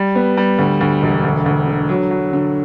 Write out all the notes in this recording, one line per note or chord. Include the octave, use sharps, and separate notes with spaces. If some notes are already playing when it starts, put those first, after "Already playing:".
Already playing: G3
B3
G3
D2
D2
E1
D2
D2
D3
F#3
F#3
D3